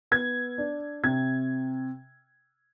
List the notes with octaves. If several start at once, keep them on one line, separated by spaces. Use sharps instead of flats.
B3 G#6
D4
C3 G#6